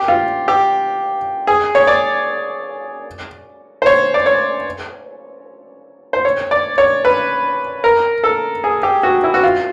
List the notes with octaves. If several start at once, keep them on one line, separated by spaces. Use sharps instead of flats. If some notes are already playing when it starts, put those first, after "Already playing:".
Already playing: G4
F4
G4
G#4
C#5
D5
C5
C#5
D5
C#5
C5
C#5
D5
C#5
B4
A#4
A4
G#4
G4
F#4
E4
F#4
F4